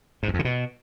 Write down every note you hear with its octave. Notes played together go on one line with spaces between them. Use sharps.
G#2
E2
F2
D3
B2